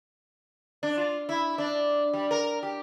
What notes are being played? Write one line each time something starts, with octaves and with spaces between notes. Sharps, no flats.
D4
F4
E4
D4
G3
A#4
G4